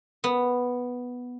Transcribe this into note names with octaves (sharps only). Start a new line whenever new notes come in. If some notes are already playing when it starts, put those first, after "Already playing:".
B3